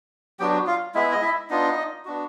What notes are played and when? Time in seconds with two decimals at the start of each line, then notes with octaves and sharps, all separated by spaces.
0.39 F#3 B3 D4 F#4 G4 G5
0.67 F4 F5
0.95 G#3 B3 E4 E5
1.12 D#5
1.22 E4 E5
1.50 B3 D4 D#4 F4 D#5
2.05 B3 D4 F#4